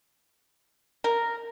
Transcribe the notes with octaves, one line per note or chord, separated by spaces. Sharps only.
A#4